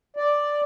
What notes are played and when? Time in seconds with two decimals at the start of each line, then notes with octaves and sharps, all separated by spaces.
0.17 D5